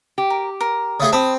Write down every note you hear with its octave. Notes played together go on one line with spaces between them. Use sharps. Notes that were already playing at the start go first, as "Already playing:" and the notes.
G4
A#4
A#4
C#3 A3 G#4
C4 A5 B5 D#6